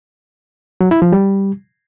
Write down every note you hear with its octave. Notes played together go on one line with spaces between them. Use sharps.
F#3
E4
F3
G3